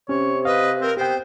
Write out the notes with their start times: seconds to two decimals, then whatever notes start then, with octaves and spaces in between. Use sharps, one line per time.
0.09 C3 C#4 C#5
0.45 B4 D#5 F5
0.81 C4 A#4
0.97 B3 G4 C5 G5